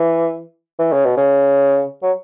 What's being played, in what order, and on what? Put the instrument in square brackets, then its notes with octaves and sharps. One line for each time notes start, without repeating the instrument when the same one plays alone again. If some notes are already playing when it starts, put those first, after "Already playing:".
Already playing: [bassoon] E3
E3
C#3
B2
C#3
F#3